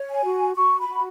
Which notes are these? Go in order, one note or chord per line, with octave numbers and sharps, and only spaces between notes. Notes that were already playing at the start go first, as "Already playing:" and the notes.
Already playing: C#5
G#5
F#4
F#4 C#6
B5
F#4